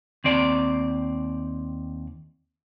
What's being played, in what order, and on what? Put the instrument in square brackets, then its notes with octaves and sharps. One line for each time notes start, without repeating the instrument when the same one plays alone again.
[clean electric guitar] D#2 C4 D5